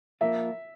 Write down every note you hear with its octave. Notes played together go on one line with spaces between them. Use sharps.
F3 A#3 F4 A#4 E5